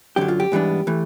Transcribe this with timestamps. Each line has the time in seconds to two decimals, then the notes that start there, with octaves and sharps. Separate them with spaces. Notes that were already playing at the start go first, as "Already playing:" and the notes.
0.16 F#2 D3 F#3 G4
0.28 F4
0.40 G4
0.52 G#2 E3 G3 B3 D4
0.87 E3 A3